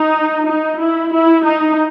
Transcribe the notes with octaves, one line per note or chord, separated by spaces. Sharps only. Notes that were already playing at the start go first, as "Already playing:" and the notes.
Already playing: D#4
D#4
E4
E4
D#4